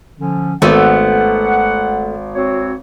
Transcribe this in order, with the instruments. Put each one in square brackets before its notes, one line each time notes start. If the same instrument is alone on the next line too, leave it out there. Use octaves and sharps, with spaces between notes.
[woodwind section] D3 F3 C#4
[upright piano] G#1 [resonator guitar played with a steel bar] A3 B3 [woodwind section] F#5
[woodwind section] C4 F#4 C#5